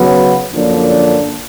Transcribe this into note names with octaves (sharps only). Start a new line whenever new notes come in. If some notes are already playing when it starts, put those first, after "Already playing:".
Already playing: C#3 F#3 B3
F#2 D3 F3 A#3 D4